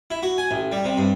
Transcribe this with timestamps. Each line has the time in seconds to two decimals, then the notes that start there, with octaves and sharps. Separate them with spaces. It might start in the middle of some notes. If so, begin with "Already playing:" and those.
0.11 E4
0.23 F#4
0.38 G#5
0.51 A1
0.72 G3
0.85 C3
0.98 G2